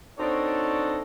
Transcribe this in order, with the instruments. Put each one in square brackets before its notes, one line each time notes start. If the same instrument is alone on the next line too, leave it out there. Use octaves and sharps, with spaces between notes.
[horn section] C4 D4 D#4 F#4 A4 C#5